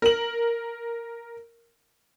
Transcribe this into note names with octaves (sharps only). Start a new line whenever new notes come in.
A#4 F#7